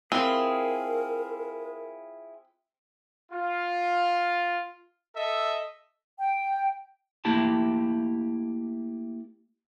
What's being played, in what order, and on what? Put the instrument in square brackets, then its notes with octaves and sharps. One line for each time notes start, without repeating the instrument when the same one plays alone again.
[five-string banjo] C4 [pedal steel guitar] E4 F4 G#4 [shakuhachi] A#4
[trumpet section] F4
A4 D#5 E5
[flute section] G5
[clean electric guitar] A3 A#3 E4 G4 A5